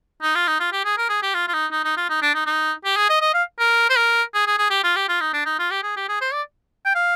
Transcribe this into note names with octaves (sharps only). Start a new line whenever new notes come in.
D#4
F4
D#4
F4
G4
G#4
A#4
G#4
G4
F4
F4
D#4
D#4
D#4
F4
D#4
D4
D#4
D#4
G4
G#4
D#5
D#5
F5
A#4
C5
A#4
G#4
G#4
G#4
G4
F4
G4
F4
D#4
D4
D#4
F4
G4
G#4
G4
G#4
C5
D5
G5
F5